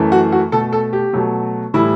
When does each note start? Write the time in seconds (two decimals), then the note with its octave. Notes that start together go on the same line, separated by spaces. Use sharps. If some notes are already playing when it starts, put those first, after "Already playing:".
Already playing: F#2 E3 A3
0.12 F#4
0.32 F#4
0.52 B2 A3 A4
0.73 A4
0.93 G4
1.13 B2 F#3 A3
1.74 A2 E3 G3 E4